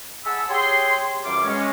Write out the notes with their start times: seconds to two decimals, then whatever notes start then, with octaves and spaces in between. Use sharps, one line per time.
0.25 G#4 F#5 A5 B5 E6
0.49 G4 G#4 C#5 C6
1.24 F#2 E3 G3 F4 D6
1.45 G#3 C#4